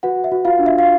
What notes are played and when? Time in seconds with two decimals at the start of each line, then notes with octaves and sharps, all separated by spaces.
0.03 F#4 B4 F#5
0.24 E5
0.32 F#4
0.45 F4 F5
0.59 D4
0.66 E5
0.78 F5